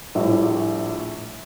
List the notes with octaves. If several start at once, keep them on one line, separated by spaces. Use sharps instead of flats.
A#1 A2 G3